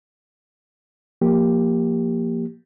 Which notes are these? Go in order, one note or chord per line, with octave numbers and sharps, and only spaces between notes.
F3 A#3 G4